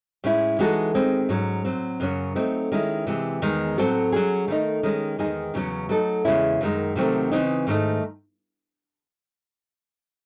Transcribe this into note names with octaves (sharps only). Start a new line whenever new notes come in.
A2 G#3 C#4 E4
E3 G#3 D#4 F#4 A4
D#3 G#3 C4
G#2 F#3 C#4
A2 F#3 C4
F#2 C#3 F#3 C#4
F#3 A3 C4 D#4
D#3 G#3 C#4 E4
C3 E3 G#3
E2 D#3 G#3
A2 F#3 C4 F#4 A4
F#3 C#4 G#4
D#3 A3 D#4
D#3 G#3 C#4
E2 D#3 G#3 D#4 G#4
E2 C#3 F#3 C#4
F#3 A3 D#4 A4
E2 C#3 G#3 C#4 E4
F#2 D#3 G#3
C3 D#3 F#3 A3 C4
C#3 E3 C4 D#4
G#2 D#3 A3 D#4